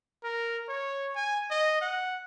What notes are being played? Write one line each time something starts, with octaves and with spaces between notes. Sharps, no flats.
A#4
C#5
G#5
D#5
F#5